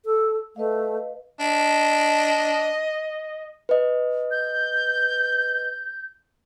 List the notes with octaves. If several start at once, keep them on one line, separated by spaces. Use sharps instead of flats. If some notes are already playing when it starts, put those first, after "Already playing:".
A4
A3 B4 D#5 F5
D4 D#5
B4 D#5
G6